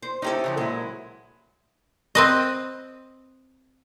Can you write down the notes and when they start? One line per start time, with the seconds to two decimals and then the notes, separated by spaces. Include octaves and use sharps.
0.02 C5
0.22 C#4 D#4 E4 G4 A4
0.44 C#3 E3 F3
0.57 A#2 F#3 G#3 E4
2.15 C4 B4 D#5